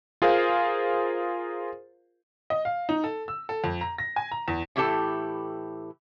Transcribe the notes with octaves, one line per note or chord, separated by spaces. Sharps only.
F4 G#4 A#4 C5 F5
D#5
F5
D#4
A4
E6
A4
F2
A#5
A#6
G#5
A#5
E2
A2 E3 E4 G4 A4 A5